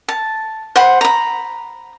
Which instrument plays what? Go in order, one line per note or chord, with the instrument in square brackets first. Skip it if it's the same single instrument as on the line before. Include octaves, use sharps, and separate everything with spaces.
[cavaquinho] A5
C5 F#5 B5
A#5 B5